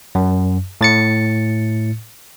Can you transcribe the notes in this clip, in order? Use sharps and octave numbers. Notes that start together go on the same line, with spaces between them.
F#2
A2 A6 C#7